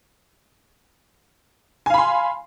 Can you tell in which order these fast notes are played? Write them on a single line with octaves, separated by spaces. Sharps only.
G#5 F5 B5 C6